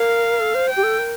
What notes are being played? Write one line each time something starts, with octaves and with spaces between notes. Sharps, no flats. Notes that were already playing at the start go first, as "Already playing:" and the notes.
Already playing: A#4 F5
A4
C5
G5
G4
A4
A#4